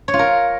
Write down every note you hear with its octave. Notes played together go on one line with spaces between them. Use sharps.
C#5
F4
A#4